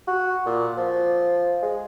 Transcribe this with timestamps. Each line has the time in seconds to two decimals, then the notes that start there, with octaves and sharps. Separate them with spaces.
0.07 F#4
0.46 A#2
0.77 F3
1.62 G#3